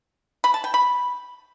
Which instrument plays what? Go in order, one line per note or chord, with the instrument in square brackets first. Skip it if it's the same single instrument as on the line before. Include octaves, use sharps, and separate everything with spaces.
[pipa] B5
A5
G5
B5